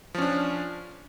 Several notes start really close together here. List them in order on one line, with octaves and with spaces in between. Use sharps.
F3 C#4 D4